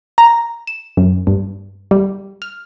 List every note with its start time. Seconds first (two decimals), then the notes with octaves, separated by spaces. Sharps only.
0.18 A#5
0.67 E7
0.97 F#2
1.27 G2
1.91 G3
2.42 F6